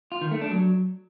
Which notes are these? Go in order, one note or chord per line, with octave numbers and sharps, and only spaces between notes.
F4
D#3
A3
D4
F#3